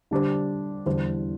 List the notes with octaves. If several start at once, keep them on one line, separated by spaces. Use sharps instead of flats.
D3 G3 D4 G4 C5
E2 D3 G3 E4 C5